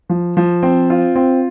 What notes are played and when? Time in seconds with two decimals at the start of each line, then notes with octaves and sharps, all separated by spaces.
0.09 F3
0.37 F3
0.63 C4
0.90 F4
1.16 C4